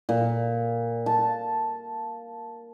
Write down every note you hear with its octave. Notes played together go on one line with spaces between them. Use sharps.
A#2
A5